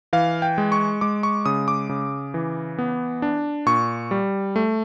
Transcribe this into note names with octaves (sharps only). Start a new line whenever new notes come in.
E3 F5
G5
G#3
C#6
G#3 D6
C#6
C#3 D#6
D6
C#3
E3
B3
D4
A#2 C#6
G3
A3